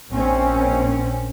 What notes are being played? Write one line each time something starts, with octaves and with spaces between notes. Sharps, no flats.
A#1 A#2 C4 C#4